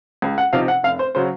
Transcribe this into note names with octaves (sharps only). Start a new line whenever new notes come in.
C#2
F#5
C3 F3 C4 D#4 F5
F#5
F1 F5
C5
C#3 F#3 C5